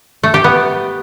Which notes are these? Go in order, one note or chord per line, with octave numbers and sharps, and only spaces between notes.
A3
G4
B3